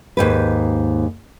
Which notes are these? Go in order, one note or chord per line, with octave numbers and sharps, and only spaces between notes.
D#2 G#2 B4